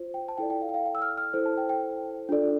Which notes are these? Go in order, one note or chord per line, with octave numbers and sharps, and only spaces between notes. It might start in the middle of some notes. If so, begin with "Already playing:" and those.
Already playing: F4 C5
G5
A5
E4 A4 D5 G5
G5
F5
G5
F5
G5
E6
F6
F6
E4 A4 C5
A5
G5
G5
D4 F4 A4 D5